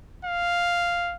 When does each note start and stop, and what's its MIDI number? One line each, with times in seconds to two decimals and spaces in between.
0.25 1.16 77